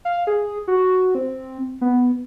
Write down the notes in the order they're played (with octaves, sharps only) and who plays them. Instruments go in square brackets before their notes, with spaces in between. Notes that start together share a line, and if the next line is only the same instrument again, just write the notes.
[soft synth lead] F5
G#4
F#4
C4
B3